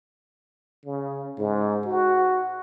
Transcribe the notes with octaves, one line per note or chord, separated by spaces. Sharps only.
C#3
G#2
F#4